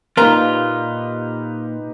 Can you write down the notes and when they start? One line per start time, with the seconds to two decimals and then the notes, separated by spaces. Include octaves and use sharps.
0.17 A#2 D#4 F4 G4 A#4 B4 A#5